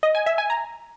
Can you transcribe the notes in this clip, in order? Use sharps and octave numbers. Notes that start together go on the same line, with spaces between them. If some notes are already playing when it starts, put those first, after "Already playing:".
D#5
G#5
E5
G#5
A#5